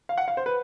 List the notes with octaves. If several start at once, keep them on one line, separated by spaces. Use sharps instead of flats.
F5
F#5
F5
C5
B4